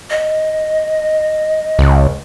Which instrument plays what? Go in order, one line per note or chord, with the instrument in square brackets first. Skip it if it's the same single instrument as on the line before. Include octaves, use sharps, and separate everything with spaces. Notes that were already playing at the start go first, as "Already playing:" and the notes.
[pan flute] D#5
[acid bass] C#2